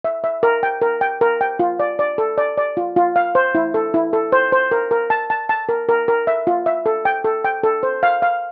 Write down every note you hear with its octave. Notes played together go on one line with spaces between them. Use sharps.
E5
E5
A#4
G5
A#4
G5
A#4
G5
F4
D5
D5
A4
D5
D5
F4
F4
F5
C5
E4
A4
E4
A4
C5
C5
A#4
A#4
A5
A5
A5
A#4
A#4
A#4
E5
F4
E5
A4
G5
A4
G5
A4
C5
F5
F5